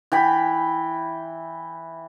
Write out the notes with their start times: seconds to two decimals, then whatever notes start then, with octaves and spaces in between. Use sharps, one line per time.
0.12 E3 G5 B5